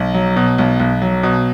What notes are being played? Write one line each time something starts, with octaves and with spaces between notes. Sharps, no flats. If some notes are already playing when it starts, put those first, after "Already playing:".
Already playing: B1
F#3
B2
B1
B1
F#3
B2